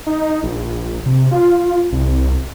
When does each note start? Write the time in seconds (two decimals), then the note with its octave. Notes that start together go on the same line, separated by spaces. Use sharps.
0.07 D#4
0.43 A#1
1.06 C3
1.31 F4
1.92 C2